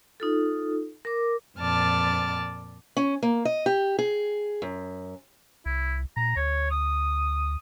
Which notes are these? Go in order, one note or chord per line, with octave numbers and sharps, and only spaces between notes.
D#4 F4 A4
A#4 D6
F2 A#2 D5 A5 F6
C#4
A#3
D#5
G4
G#4
F#2
C2 E4
A#2 A#5
D2 C#5
D#6